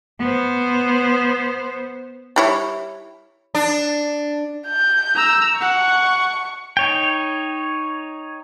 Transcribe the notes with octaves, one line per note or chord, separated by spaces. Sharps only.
B3 C5
G3 E4 C#5
D4
G6
A#5 E6
F#5 C#6
D#4 C#5 G5